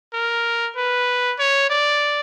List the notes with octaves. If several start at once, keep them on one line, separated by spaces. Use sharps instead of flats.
A#4
B4
C#5
D5